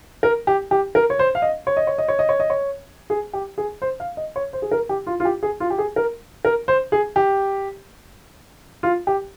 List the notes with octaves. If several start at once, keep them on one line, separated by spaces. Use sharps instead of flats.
A#4
G4
G4
A#4
C#5
C5
F5
D#5
C#5
D#5
C#5
D#5
C#5
D#5
C#5
D#5
C#5
G#4
G4
G#4
C5
F5
D#5
C#5
C5
G#4
A#4
G4
F4
F4
G4
G#4
F4
G4
G#4
A#4
A#4
C5
G#4
G4
F4
G4